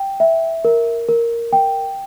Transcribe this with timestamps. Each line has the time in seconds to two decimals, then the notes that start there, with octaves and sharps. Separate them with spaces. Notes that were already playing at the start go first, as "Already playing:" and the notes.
Already playing: G5
0.20 E5
0.65 A#4
1.09 A#4
1.53 G5